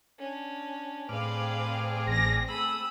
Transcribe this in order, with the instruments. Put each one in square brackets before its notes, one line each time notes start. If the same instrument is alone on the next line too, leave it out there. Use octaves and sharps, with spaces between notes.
[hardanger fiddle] C#4 D4
[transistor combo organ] A2 D5 F6 [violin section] C4 G#4 [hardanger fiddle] B4 F5
[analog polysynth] A1 A#6
[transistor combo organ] A3 [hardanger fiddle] B5 D#6 [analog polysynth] E6